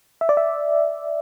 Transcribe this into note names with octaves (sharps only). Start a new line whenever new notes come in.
E5
D5
E5